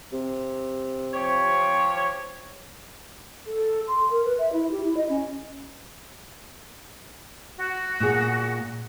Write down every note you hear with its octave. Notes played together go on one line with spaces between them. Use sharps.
C3
F3 G4 C#5
A4
C6
A#4
B4
E5
E4
G4
E4
D#5
C#4
F#4
A#2 G#4